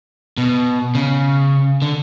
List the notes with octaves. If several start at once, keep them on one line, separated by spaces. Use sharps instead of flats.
B2
C#3
D3